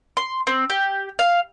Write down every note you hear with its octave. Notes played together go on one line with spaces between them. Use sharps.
C6
C4
G4
F5